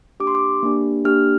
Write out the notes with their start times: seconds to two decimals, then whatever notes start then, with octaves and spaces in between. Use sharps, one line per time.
0.20 A#3 D4 G4 D6
0.27 C6
0.35 D6
0.63 A#3 D4 G4
1.05 A#3 D4 G4 F6